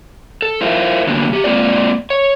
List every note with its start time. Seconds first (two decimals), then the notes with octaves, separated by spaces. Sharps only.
0.42 A4
0.61 E4 F4 A#4 C5 E5 F5
1.07 D3 F#3 A#3 B3 D4
1.30 C#3 G4
1.44 G#3 A#3 C4 F4 D5
2.10 C#5